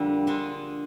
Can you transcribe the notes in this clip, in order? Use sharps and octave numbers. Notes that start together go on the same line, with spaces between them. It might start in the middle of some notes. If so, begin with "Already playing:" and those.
Already playing: F2 D3 G3 A#3 D4
D3 G#3 D4 F4